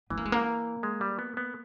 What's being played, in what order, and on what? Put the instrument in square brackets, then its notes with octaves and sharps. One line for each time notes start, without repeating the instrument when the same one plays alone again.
[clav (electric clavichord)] E3 [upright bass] B3
[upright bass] A#3
G#3
A#3
[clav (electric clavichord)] G#3
G3
B3
B3